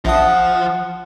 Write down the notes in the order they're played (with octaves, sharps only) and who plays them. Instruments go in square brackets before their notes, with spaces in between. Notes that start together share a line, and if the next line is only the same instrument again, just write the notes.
[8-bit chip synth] A#1 D#6 [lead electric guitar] F3 [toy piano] F4 E5 A5 [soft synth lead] F#5